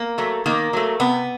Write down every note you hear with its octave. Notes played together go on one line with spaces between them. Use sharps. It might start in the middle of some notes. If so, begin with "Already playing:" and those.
Already playing: A#3
F#3 A3
D#3 A#3
F#3 A3
C3 B3